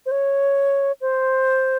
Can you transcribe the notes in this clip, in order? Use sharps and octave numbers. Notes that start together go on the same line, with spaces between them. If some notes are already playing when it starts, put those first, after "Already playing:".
C5
C#5
C5